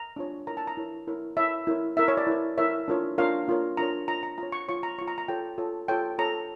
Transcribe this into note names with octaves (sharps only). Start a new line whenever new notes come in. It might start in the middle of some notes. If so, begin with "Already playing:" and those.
Already playing: A#5
D4 F4 C#5
E4 A#4 C#5 A#5
A5
A#5
E4 A#4 C#5
E4 A#4 C#5
E4 A#4 C#5 E5
E4 A#4 C#5
E4 A#4 C#5 E5
C#5
D5
E4 A#4 C#5
E4 A#4 C#5 E5
D4 F4 A#4 C#5
D4 F4 A#4 C#5 F5
D4 F4 A#4 C#5
D4 F4 A#4 C#5 A#5
F4 C#5 A#5
A#5
F4 C#5 A#5
C#6
F4 C#5 C#6
A#5
F4 C#5 C#6
A#5
A#5
F4 A4 C#5 G5
F4 A4 C#5
F4 A4 C#5 G5
F4 A4 C#5 A#5